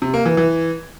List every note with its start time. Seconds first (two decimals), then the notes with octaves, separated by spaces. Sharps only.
0.02 C3
0.14 A#3
0.26 E3
0.37 E3